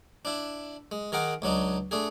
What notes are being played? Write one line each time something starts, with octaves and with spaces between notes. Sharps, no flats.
D4 E4
G#3
D#3 G#4 A#4 F#5 D6
C#2 F#3 D4 D#4
A3 D4 G#4